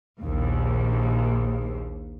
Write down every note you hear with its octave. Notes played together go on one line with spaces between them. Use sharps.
A#1 D#2